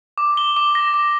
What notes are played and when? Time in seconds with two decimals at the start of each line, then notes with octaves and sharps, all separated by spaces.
0.18 D6
0.37 G7
0.56 D6
0.75 A#6
0.94 D6